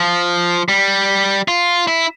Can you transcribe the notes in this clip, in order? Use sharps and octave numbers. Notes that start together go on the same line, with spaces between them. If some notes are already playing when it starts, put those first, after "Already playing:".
Already playing: F3
G3
F4
E4